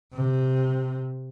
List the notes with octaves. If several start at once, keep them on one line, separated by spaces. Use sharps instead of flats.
C3